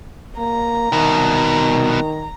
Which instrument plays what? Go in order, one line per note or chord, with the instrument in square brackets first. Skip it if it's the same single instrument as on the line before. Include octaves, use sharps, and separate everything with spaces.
[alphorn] A#3 [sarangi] A#5
[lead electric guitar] C2 B2 [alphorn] D#3